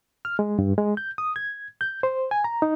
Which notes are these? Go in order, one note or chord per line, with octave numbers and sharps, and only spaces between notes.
F6
G#3
G2
G#3
G6
D#6
G#6
G6
C5
G#5
A#5
D#4